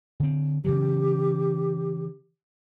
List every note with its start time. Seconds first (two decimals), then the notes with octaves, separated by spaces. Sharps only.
0.20 D3 C4
0.65 C#3 E3 F#3 G4